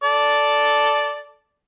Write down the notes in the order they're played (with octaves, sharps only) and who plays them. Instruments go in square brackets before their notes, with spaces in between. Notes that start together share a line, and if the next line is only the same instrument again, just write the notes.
[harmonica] A4 D5